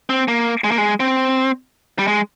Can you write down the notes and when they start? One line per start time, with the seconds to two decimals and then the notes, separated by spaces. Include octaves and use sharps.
0.10 C4
0.28 A#3
0.64 G#3
0.71 A#3
0.78 G#3
1.00 C4
1.99 G3
2.07 G#3